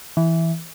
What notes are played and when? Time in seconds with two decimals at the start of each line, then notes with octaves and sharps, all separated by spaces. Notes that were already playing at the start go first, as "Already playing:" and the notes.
0.17 E3